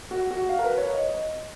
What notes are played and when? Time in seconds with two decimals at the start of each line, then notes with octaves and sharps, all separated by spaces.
0.11 F#4
0.31 F#4
0.49 F5
0.59 A#4
0.64 B4
0.78 C#5
0.93 D#5